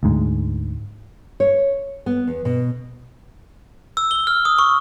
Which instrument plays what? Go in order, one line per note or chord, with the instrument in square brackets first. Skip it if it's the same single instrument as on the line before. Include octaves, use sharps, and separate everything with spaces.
[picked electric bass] D2 G#2
[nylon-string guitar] C#5
B3
E2
B2
[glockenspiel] E6
G7
F6
D#6
C#6